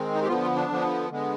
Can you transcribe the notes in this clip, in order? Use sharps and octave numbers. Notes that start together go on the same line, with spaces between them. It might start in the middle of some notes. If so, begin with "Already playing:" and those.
Already playing: D#3 G#3 C4
D#4
G4
D3 F3 B3 F4
F4
D4
D3 F3 B3
D3 G#3 B3